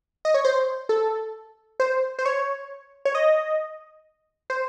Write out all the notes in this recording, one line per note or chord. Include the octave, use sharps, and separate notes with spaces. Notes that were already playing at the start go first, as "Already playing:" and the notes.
D#5
C#5
C5
A4
C5
C5
C#5
C#5
D#5
C5